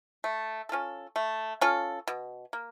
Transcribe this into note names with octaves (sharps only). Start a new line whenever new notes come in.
A3
C#4 F4 A4
A3
C#4 F4 A4
B2
A#3